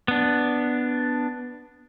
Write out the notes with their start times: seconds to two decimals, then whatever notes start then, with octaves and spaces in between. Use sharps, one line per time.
0.08 B3 D4